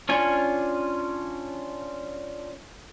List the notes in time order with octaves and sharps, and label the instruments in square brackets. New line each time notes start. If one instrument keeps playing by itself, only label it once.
[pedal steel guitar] C#4 D4 F4 G#5